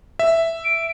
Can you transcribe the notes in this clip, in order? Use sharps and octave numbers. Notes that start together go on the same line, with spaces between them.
E5
D7